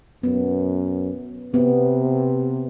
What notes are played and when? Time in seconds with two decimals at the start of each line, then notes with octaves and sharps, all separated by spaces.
0.23 F#2 B3
1.54 C3 B3